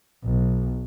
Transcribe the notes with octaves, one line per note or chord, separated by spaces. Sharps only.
B1